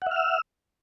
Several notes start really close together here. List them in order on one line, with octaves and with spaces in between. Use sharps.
F#5 E5 F6 E6